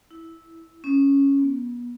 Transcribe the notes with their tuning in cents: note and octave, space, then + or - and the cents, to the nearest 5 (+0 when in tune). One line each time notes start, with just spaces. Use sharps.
E4 -10
C#4 +0
B3 -35